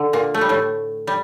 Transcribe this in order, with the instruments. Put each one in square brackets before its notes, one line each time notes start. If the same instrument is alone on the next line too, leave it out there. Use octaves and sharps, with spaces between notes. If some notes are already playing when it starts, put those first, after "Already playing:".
Already playing: [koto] D3
A#2 A#3
A3
G3
A2 A3
G3